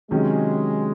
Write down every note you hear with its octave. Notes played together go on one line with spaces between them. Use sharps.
C3 D#3 F#3 G#3 C#4